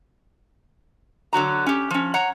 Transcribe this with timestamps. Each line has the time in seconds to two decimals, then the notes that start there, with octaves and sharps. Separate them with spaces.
1.33 D3 F#3 F#4 A#5
1.66 C#4 G4
1.91 F3 C#4
2.14 C#5 F#5 A#5